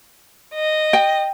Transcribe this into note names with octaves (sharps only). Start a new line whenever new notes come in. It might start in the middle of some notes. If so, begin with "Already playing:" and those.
D#5
G5